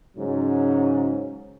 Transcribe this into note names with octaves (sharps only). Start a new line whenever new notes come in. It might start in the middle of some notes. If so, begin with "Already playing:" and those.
G#2 C#3 F#3 C#4